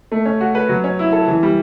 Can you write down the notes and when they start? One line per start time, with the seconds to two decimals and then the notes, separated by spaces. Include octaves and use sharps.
0.12 A3
0.25 C#4
0.41 F#4
0.55 B4
0.69 F#3
0.84 C#4
0.99 E4
1.13 A4
1.28 E3
1.43 G3